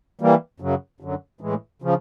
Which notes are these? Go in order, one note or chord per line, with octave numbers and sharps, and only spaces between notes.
E3 G3 A#3
F#2 C#3 F#3
F#2 D3 F#3
A2 E3 G#3
C#3 F3